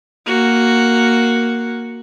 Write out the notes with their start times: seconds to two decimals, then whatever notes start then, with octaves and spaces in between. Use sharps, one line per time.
0.27 A#3 F#4